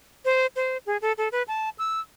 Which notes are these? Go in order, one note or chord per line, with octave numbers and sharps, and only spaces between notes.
C5
C5
G#4
A4
A4
B4
A5
E6